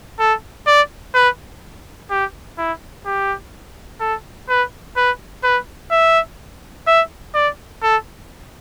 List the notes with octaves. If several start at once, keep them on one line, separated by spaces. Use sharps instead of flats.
A4
D5
B4
G4
E4
G4
A4
B4
B4
B4
E5
E5
D5
A4